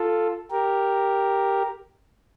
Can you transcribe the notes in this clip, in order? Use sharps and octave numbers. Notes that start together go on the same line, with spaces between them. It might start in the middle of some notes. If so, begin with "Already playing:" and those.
Already playing: F4 A4
G4 A#4